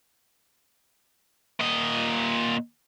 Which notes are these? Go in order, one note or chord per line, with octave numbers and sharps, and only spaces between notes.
A#2 D#5